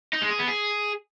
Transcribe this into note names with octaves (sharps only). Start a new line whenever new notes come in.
D#4
G#3
G#4
B3
G#4